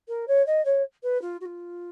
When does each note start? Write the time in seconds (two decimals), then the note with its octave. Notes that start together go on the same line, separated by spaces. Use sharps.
0.08 A#4
0.28 C#5
0.47 D#5
0.65 C#5
1.03 B4
1.22 F4
1.41 F#4
1.46 F4